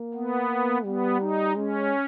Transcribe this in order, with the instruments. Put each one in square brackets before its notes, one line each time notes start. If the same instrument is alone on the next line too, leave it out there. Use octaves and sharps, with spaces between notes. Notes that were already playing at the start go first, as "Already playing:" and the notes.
Already playing: [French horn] A#3
[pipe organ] B3
[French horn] G3 [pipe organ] B3
[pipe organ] D#4
[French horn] G#3 [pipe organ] C#4